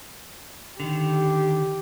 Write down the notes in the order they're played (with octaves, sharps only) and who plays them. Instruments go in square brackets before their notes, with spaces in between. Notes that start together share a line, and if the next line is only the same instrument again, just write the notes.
[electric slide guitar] D3 D#3 [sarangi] G4